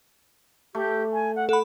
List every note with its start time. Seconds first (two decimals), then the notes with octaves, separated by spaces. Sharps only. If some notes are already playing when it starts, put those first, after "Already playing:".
0.75 A3 G4
1.13 G#5
1.35 F#5
1.49 A4 F#5 B5